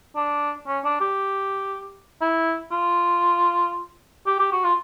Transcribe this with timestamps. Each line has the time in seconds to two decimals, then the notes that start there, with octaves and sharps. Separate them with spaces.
0.16 D4
0.67 C#4
0.85 D4
1.01 G4
2.21 E4
2.72 F4
4.26 G4
4.39 G4
4.52 F#4
4.64 F4